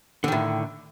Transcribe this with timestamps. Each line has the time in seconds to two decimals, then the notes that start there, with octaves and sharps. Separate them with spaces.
0.24 D3
0.28 D#3
0.32 A2